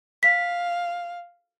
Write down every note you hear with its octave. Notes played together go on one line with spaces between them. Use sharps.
F5 B6